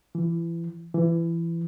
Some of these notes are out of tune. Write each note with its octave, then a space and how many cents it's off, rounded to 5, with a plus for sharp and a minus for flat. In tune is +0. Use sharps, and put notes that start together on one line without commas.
E3 +30
E3 +25